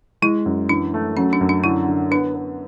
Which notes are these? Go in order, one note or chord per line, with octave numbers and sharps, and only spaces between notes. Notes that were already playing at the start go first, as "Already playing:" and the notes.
G#3 E4
F#2
E3 D4
A3
F#3 C#4
D4
F#2
D4
D3 E4
D3
B3 D4
B3